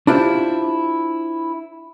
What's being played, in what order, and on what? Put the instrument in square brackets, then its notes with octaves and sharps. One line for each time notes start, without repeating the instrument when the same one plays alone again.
[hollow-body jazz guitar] D4 E4 F4 G4 C5